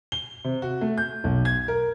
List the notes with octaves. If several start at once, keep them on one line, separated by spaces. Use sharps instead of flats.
G7
C3
F#4
A3
G6
B1
G#6
A#4